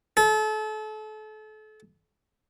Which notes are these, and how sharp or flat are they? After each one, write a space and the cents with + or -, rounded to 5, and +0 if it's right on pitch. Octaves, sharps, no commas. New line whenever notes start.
A4 -35